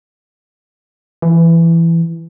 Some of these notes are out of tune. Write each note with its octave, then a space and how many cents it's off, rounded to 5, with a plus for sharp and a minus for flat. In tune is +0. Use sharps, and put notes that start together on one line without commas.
E3 +15